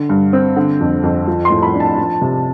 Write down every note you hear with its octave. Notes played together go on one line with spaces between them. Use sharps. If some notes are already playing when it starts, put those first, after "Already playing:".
Already playing: D3
G2
C4
D3
F2
F2
F3
C6
A2
B5
D4
A5
F3
C3